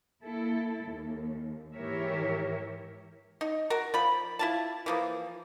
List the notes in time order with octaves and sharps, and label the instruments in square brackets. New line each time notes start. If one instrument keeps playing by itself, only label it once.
[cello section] A#3 E4 A4
D#2
G#2 E3 G4 A#4 C#5 E5
[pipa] D#4
F#4 A#4
F3 B5
E4 F4 A5
E3 F3 A#3